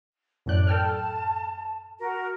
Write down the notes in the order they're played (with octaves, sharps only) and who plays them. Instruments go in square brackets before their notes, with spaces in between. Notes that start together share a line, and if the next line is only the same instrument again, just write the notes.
[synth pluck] F#2 A2 F#6 [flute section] D5
[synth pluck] A4 G5 F6 [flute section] A5
[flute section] F#4 A#4